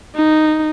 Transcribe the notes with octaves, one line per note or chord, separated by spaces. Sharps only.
D#4